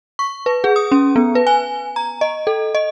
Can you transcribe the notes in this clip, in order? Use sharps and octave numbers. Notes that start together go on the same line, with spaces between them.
C#6
B4
G#4
D#6
C#4
B3
B4
G#5
A#5
D#5
A4
D#5